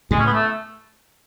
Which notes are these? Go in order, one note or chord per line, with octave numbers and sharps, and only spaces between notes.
A2 C#3 G#3
C#4
B3
A3